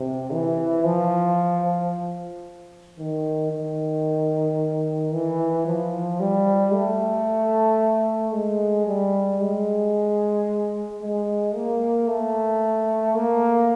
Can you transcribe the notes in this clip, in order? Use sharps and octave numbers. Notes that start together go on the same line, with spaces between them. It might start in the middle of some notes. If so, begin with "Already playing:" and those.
Already playing: C3
E3
F3
D#3
D#3
E3
F3
G3
A3
G#3
G3
G#3
G#3
A#3
A3
A#3